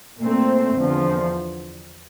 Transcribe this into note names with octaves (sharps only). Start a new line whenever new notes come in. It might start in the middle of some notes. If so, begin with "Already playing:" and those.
A#2 A3 C4
E2 D3 F3